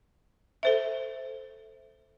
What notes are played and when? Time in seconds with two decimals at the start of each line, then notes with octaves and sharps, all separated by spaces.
0.63 A4 C5 E5